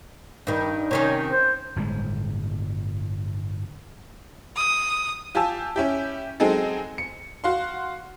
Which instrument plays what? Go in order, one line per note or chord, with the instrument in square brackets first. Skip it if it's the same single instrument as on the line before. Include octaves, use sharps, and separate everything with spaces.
[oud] G2 D#3
[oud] C3 D#3 C#4 [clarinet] C#5
[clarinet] C5
[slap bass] G1 A2 C#3 G#3
[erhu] D#6
[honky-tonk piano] F4 G4 G#5 A5 E6
C#4 E4 G4
F#3 G#3 C4 D#4 G#4 A4
C#7
F#4 F5 C6